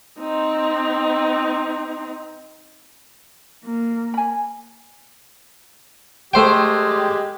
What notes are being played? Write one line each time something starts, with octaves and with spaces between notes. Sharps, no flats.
C4 D#4
A#3
G#5 B5
G#3 A3 G4 C5 G5